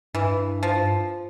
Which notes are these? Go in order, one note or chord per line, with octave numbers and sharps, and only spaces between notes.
G2 E3
F3